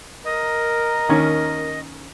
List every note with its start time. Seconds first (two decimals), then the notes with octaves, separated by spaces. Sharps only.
0.25 A#4 D#5
1.09 D#2 D#3 C#4